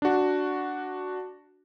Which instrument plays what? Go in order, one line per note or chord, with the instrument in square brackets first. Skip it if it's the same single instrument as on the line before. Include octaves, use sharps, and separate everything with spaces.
[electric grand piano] D4 F#4